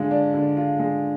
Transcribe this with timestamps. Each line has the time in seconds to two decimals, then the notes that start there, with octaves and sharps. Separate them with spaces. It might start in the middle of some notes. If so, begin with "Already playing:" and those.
Already playing: D3 G#3 F4
0.11 D4
0.34 D3
0.57 F4
0.79 G#3